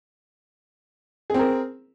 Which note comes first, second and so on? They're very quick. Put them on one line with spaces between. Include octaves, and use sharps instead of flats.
G#4 C4 A#4